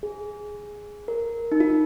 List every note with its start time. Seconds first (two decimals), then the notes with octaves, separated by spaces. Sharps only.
0.03 G#4
1.08 A#4
1.52 D#4
1.60 F4